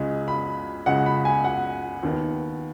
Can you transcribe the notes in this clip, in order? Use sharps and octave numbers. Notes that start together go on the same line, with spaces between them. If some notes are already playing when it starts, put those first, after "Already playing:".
Already playing: C#2 C#3 G#3
B5
C#2 C#3 G#3 F#5
B5
G#5
F#5
D#2 D#3 B3